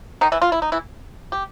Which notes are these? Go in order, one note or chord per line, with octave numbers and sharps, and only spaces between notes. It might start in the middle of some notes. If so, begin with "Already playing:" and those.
D#3 D#4
E3 E4
F4
E4
D#4
E3 E4
G4